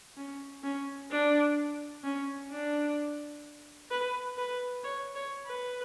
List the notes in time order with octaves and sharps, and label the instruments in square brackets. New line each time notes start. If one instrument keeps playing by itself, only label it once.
[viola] C#4
C#4
D4
C#4
D4
B4
B4
C#5
C#5
B4